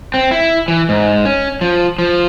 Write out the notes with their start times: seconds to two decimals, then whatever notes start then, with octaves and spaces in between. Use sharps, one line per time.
0.14 C4
0.31 E4
0.68 E3
0.89 G#2
1.25 C#4
1.61 F3
1.99 F3